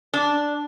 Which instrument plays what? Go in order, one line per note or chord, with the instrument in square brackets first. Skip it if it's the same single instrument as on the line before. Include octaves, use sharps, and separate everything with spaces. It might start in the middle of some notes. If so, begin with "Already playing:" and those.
[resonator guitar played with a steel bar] D4